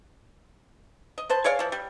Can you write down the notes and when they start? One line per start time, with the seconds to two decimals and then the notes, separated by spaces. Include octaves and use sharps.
1.18 D#5
1.30 B4 C5 A5
1.44 G#4 C#5 D5 F5
1.59 E3 F3
1.72 G3